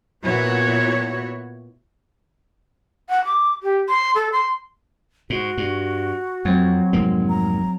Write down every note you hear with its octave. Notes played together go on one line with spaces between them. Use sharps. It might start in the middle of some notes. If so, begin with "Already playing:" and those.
A#2 B3 E4 F#4 C#5
F#5
D6
G4
C6
A4
C6
G#2 F#4
G2
F2 F#3 C4
F1 G#2 A#3
A#5